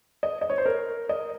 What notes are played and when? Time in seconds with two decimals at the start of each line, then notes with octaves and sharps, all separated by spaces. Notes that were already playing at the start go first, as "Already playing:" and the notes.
0.23 D#5
0.41 D#5
0.50 C#5
0.58 C5
0.66 A#4
1.09 D#5